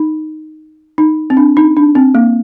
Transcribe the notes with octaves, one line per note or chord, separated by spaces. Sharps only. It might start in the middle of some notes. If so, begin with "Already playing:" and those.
Already playing: D#4
D#4
C4
D4
D#4
D4
C4
A#3